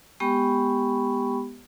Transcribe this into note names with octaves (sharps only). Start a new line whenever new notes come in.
G#3 B3 G4 G5 B5 C#6